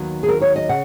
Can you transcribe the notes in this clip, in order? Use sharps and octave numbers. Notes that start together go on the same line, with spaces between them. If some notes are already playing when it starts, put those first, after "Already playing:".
Already playing: D#2 D#3 F#3 B3
G#4
A#4
C#5
D#5
C#3 F#5